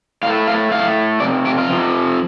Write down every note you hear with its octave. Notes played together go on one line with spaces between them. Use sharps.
A2 A3 F5
F5
A2 A3 F5
F2 C3 D5
G4
F4
F2 C3 F3